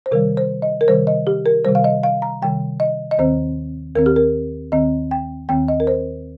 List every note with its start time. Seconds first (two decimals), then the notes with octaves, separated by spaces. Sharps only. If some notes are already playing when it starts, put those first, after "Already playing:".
0.06 C5
0.11 C3 D#3 G3 A#4
0.37 C5
0.62 D#5
0.81 A#4
0.88 C3 D#3 G3 C5
1.07 D#5
1.27 G4
1.46 A#4
1.65 C3 D#3 G3 C5
1.75 F5
1.84 D#5
2.03 F5
2.22 A#5
2.42 C3 D#3 G3 G5
2.80 D#5
3.11 D#5
3.18 D#2 D#3 C4 C5
3.95 D#2 D#3 C4 A#4
4.06 G4
4.16 A#4
4.72 D#2 D#3 C4 D#5
5.11 G5
5.49 D#2 D#3 C4 G5
5.68 D#5
5.80 A#4
5.87 C5